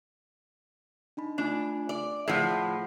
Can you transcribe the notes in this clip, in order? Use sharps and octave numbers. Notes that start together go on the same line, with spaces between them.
D4 D#4 B5
A3 D4 F4 G#5
D5
A2 F3 G#4 F#5 C7